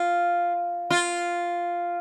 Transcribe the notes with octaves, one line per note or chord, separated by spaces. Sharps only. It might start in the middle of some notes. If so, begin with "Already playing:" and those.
Already playing: F4
F4